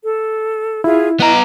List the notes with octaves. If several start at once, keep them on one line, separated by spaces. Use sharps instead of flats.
A4
E4 F4 G#4 E5
B3 D#5 A#5